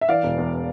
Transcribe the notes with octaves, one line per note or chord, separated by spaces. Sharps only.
E5
E3 D5 F5
E1
E2